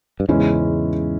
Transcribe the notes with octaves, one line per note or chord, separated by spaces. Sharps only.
G2
E2 G#2 C#3 G#3 C#4 E4